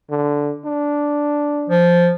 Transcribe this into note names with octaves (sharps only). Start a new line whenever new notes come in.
D3
D4
F3